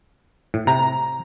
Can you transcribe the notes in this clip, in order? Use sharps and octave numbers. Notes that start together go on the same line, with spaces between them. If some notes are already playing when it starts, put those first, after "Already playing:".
A2
C3 A#5